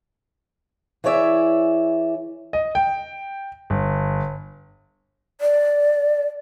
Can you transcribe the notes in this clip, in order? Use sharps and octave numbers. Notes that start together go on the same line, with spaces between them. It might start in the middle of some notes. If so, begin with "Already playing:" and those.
E3 E4 G#4 C#5 D5 E5
D#5
G5
G1
D5